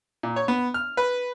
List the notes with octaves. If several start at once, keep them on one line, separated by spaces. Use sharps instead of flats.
A#2
C#5
B3
F6
B4